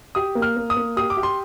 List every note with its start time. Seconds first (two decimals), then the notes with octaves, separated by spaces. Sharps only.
0.15 G4 D#6
0.35 A#3
0.42 F6
0.57 A#3
0.70 D#6
0.77 A#3
0.97 G4 D#6
1.10 D6
1.17 G4
1.23 C6